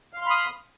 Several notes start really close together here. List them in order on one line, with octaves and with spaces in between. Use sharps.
F5 C6 F6 B5 D#6